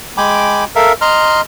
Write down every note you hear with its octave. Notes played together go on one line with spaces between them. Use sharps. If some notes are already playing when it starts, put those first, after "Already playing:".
G#3 G5 G#5 B5 D6
A4 A#4 E5 F5
D#5 A#5 C6 F6